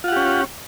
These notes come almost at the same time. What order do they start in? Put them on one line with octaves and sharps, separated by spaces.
F4 F#5 G4 C#4